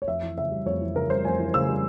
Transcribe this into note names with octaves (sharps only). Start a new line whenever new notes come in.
C#5
F2 E5
E3
C#3 E5
G3
F2 C#5
E3
C#3 A#4
G3 C5
F2 G#5
E3
C#3 E6
G3